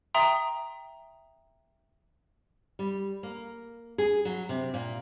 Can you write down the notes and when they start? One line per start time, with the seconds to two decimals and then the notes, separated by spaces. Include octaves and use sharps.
0.14 E5 G5 A#5 C6 D#6
2.79 G3
3.23 A#3
3.98 G#4
4.25 F#3
4.49 C3
4.74 A#2